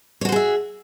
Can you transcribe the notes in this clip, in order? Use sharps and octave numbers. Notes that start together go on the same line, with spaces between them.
F#4 G#4 C5 C#5 E5